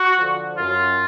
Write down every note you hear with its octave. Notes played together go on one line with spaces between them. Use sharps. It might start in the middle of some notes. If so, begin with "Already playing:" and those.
Already playing: F#4
D3 F3
F#2 F4